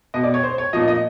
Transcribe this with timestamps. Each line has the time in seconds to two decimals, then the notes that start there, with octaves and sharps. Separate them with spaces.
0.14 B2 D#5
0.24 D5
0.34 C#5
0.43 C5
0.58 C#5
0.73 A#2 F3 D#5
0.88 D#5